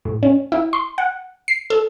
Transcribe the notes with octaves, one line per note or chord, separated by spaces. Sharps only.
A2
C#4
E4
C6
F#5
C7
A4